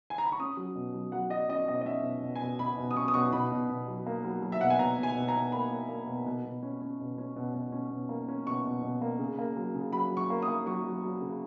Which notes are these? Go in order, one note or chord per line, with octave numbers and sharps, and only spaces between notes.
G#5
A#5
B5
C#6
C#4 D#6
F#3
B2
F#3
F#3 F#5
F#3 D#5
C#4 D#5
B2 D#5
D#5
C#4 E5
B2
B2
G#5
B2
B2 B5
B2
D#6
C#4 C#6
D#6
B2 C#6
B2 B5
B2
B2
F#3
A#3
F#3
F#3
E5
B2 F#5
G#5
B2 A#5
B2 G#5
B2
A#5
B2
A#3 B5
A#3
A#3
B2
B2
B2
C#4
C#4
B2
C#4
B2
B2
C#4
B2
A#3
C#4
B2 C#6
B2
B2
A#3
C#3
A#3
F#3
C#3
F#3 B5
F#3
C#6
A#3
D#6
A#3
F#3 C#6
F#3
F#3
C#3